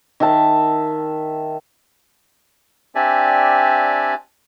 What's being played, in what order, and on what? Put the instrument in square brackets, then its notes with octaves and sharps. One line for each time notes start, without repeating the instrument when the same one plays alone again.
[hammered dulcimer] D#3 E5 A5
[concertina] C4 D4 G4 D5 E5 G#5